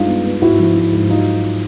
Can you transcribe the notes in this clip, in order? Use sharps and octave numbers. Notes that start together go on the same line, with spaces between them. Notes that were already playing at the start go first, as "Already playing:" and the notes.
Already playing: G2 G#3 D#4 F4
B3
B3
G#2 E4 F#4
F3
F3
G#2
F#3 D#4 F4